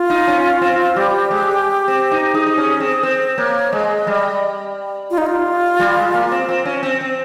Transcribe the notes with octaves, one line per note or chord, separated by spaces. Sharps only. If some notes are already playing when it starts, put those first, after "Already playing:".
Already playing: F4
D#4
C#4
C4
G3 G4
G#3
C4
D#4
D#4 G#4
D#4
C#4
C4
C4 C5
A#3 C#5
G#3 D#5
G3
F4
D#4
F4
G3
G#3
A#3
C4
C4
C#4
C4
C4